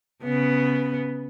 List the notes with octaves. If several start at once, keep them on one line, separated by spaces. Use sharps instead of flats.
C#3 B3